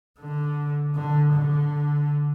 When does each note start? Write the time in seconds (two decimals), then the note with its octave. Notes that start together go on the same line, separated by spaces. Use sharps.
0.20 D3
0.95 D3
1.33 D3